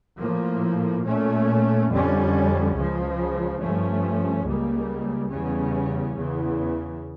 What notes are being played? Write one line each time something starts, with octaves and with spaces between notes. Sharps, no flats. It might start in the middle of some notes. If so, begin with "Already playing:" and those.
A2 F3 A#3
A#2 A3 C#4
F2 D3 G3 C#4
C#2 C#3 F3
G2 F3 A3 C#4
C#2 C#3 G3 A#3
E2 C#3 G3 C#4
E2 C#3 E3